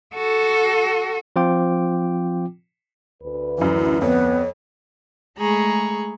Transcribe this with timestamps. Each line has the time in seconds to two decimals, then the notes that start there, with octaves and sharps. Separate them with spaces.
0.14 F#4 A4
1.36 F3 C4 F4 G5 D6
3.23 D2 B4
3.58 F#2 E3 E4
4.01 F2 B3 C#5
5.38 G#3 A3 G#4 A#5 B5 C#6